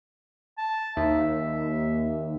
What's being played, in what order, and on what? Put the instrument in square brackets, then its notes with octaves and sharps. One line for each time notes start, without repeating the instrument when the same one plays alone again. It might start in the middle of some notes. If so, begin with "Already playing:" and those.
[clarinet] A5
[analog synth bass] D#2 [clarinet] E5